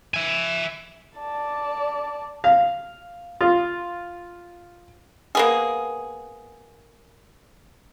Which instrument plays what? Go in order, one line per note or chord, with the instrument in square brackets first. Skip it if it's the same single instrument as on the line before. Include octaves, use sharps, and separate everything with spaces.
[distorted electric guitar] E5 G#5
[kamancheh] D5 A5
[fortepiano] F5
F4
[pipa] A#3 B3 G#4